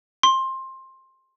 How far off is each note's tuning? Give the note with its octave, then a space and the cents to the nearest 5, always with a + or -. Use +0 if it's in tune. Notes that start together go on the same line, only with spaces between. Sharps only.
C6 +20